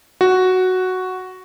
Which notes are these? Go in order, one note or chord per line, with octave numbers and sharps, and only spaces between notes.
F#4